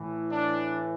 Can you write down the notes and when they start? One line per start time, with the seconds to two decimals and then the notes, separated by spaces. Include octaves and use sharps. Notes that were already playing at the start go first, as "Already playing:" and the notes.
Already playing: A2 E3
0.32 D4